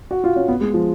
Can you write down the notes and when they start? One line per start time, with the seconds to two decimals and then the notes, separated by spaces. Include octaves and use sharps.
0.11 F#4
0.24 F4
0.36 C#4
0.48 B3
0.61 G#3
0.74 F3